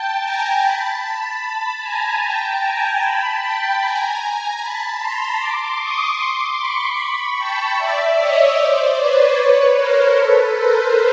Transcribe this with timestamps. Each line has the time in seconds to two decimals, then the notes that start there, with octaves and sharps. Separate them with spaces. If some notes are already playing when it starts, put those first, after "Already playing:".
Already playing: G5 A5
0.22 G#5 A#5
0.62 A5 B5
1.41 A5 B5
1.81 G#5 A#5
2.21 G5 A5
2.61 G#5 A#5
3.00 A5 B5
3.40 G5 A5
3.80 G#5 A#5
4.59 A5 B5
4.99 A#5 C6
5.39 C6 D6
5.78 C#6 D#6
6.19 C6 D6
6.58 B5 C#6
6.98 B5 C#6
7.38 G5 A5
7.77 D5 E5
8.17 C#5 D#5
8.57 C5 D5
8.97 B4 C#5
9.37 B4 C#5
9.76 A#4 C5
10.16 A4 B4
10.56 A#4 C5